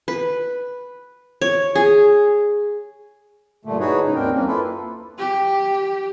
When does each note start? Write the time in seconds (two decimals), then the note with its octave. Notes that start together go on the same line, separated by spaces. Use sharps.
0.08 B4
1.41 C#5
1.75 G#4
3.65 G2 A#2 D3 A3
3.80 D#4 E4 F#4 G#4 B4 C#5
4.03 G#2 C#3 D#4
4.16 D#2 C4 D4 A#4 G5
4.32 F#2 A#3 C4 C#4
4.47 A#3 E4 F4 A4 B4
5.18 G4